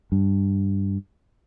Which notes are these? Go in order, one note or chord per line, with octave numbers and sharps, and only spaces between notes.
G2